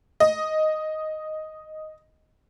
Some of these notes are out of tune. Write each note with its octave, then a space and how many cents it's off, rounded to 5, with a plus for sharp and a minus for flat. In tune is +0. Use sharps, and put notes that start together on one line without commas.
D#5 +0